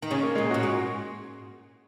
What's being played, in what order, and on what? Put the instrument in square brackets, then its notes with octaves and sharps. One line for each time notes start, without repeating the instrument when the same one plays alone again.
[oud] D#3
[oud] C#3 [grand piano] C#4
[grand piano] A#3
G#3 C#4
[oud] A#2
[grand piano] G#4
[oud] A#2 [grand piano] C#4 F#4
[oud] G#2